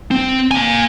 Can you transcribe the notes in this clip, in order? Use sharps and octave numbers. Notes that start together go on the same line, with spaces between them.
C4
A#3 G#5